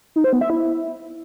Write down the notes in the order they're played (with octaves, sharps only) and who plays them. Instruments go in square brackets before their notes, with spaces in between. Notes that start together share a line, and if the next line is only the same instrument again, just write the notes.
[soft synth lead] D#4
C5
B3
E5
E4